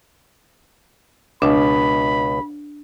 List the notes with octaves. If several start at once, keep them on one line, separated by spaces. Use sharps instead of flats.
C#2 B2 D4 B5